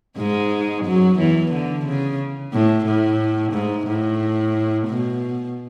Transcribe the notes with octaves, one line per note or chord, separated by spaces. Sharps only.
G#2 G#3
F#2 F#3
E2 E3
D3
C#3
A2
A2
G#2
A2
B2